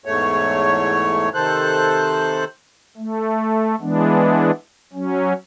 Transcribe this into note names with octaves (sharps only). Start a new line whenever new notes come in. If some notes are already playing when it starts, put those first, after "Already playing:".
E2 G#2 A3 C#5
C3 D#3 A4 C5 F#6
A3
E3 G#3 B3 D4
F#3 C#4